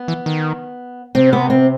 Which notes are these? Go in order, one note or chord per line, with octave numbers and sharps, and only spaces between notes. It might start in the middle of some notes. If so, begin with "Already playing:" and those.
Already playing: B3
E3
D#3
C3 C4
B3
C4